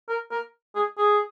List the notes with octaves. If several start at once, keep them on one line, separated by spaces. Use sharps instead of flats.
A#4
A#4
G#4
G#4